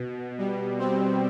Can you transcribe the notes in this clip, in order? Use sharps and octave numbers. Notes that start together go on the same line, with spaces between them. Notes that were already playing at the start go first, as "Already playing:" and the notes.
Already playing: B2
G3
C4